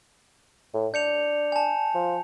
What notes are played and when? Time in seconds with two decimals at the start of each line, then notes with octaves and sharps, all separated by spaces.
0.74 A2
0.94 D4 G6 C#7 F7
1.52 G#5 A5
1.95 F3